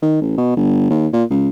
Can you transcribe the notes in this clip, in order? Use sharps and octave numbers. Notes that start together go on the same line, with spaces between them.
D#3
A1
B2
G1
D#2
A#2
C#2